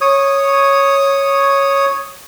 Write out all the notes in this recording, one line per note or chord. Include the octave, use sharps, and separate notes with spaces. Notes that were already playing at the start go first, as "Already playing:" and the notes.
C#5 D#6